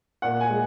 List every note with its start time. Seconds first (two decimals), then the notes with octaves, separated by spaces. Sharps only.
0.22 A#2 F#5
0.41 G#5
0.50 G#3